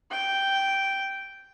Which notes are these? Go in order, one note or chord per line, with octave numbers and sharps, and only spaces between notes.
G5